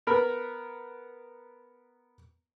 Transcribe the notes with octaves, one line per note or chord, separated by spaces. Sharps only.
B3 A#4 B5